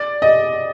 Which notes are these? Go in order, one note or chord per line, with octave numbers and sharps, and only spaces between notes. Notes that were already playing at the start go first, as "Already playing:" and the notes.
Already playing: D5
D#5